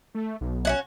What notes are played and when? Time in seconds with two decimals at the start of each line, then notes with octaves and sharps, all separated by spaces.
0.15 A3
0.41 B1
0.65 C#4 E4 F#4